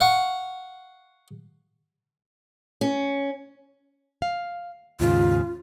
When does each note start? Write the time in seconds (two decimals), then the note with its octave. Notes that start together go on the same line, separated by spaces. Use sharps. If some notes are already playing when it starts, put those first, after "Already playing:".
0.01 F5 F#5 C#6
2.81 C#4
4.22 F5
5.00 D#2 G#2 C#3 F4